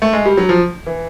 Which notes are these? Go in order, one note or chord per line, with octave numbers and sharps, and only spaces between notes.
A3
G#3
G3
F#3
F3
E3